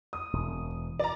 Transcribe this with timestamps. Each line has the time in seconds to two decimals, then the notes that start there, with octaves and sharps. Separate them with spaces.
0.13 D#6
0.33 E1
0.99 D5 A#5